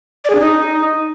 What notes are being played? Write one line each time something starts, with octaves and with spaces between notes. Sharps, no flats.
D5
G#4
D4
D#4